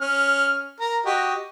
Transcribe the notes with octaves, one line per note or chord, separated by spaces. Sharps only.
C#4 F6
A#4
F#4 G4 D#5